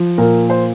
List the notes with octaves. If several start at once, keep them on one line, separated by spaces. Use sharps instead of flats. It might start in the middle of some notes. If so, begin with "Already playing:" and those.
Already playing: F3
A#2 A#4
C5